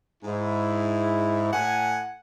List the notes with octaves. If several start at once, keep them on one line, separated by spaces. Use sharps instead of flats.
G#2 E4
A2 F#5 G#5